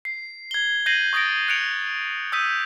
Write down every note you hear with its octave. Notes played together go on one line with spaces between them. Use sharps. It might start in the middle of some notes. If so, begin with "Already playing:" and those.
C7
G#6 G7
G6 G#6 A#6 C7 D#7 F#7
C#6 D#6 A6 A#6 D7
F#6 C#7 D7 F7
D#6 E6 G6 B6 D#7